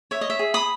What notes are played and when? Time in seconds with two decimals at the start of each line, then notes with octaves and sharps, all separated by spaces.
0.11 C#5 E5
0.21 D#5
0.30 E5
0.39 G#4
0.54 B5 D#6